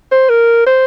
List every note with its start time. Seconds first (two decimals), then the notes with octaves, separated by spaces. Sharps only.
0.12 C5
0.29 A#4
0.66 C5